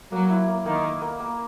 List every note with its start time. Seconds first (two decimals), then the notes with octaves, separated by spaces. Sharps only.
0.12 F#3 A#3
0.30 E4
0.48 A#3
0.66 D#3 A#3
0.84 A#3
1.02 A#3
1.20 A#3